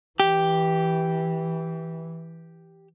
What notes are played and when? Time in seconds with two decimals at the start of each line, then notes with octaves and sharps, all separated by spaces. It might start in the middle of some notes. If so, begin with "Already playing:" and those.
0.20 E3 G4